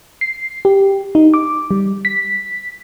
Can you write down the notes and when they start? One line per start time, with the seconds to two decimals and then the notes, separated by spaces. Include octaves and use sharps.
0.21 C7
0.65 G4
1.15 D#4
1.34 D6
1.71 G3
2.05 B6